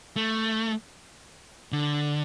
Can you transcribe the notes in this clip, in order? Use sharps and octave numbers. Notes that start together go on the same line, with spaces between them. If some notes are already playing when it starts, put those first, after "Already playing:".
A3
D3